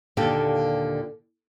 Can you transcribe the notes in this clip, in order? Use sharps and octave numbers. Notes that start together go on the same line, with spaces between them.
D#2 A#2 D3 G4 A4